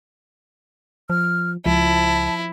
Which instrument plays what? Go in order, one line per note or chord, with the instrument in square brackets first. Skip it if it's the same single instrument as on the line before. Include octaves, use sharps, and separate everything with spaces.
[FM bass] F3 [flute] F6
[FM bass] C#2 [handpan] F3 [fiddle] E4 [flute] A5